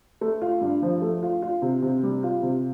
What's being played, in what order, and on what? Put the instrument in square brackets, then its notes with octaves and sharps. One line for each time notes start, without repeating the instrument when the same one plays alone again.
[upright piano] A3
F4
G2
F3
A3
F4
F4
C3
C3
G3
F4
C3